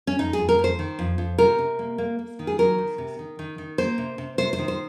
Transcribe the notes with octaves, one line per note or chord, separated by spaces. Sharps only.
C#4
F2 D#4
G#4
F2
A#4
F2 C5
D#3
F2
F2
C3 A#4
C3
A#3
A#3
A#3
D#3
G#4
F#3 A#4
D#3
C3
D#3
D#3
D#3
A#3 C5
C3
C3
C3 C5
C5
D#3
C5